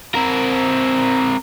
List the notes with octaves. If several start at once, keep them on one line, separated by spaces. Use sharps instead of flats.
C4 A#4